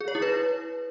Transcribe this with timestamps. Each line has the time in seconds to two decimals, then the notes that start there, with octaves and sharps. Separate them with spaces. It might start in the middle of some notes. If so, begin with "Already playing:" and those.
0.01 G#4
0.08 C#5
0.15 E4
0.22 B4